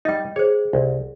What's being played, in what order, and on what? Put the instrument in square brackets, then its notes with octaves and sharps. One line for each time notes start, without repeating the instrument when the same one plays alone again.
[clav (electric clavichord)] G3 D#4 [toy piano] D#5 G5
[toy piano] G#4 C5 [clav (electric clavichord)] C#5
[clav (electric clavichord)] C2